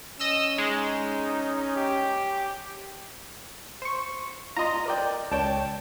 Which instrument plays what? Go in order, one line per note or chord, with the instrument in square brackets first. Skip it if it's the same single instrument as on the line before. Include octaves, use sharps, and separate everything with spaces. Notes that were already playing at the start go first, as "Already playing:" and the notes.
[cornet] C#4 [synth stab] D#5 E6 E7
[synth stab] G#3 [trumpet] D#4
[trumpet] G4
[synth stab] C5 C#6
[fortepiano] F4 C6 [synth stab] D#5 A#5
[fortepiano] A#4 D5 G5
[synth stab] C#2 G5 [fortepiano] C#5 A5